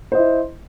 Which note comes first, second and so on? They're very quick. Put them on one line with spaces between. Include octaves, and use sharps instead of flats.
C5 D#5 E4